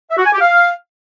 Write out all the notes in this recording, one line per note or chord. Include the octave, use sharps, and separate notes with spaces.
E5
F#4
G#5
G4
F5